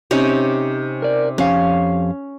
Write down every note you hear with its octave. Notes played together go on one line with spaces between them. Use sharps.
C3 C#4 D#4
A#4 D5
F2 C#4 G4 F5